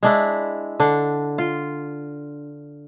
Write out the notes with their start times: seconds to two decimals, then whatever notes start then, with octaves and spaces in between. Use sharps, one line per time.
0.03 G#3 D4 E4
0.80 D3 D4
1.38 F4